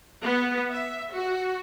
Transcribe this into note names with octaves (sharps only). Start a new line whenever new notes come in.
B3
E5
F#4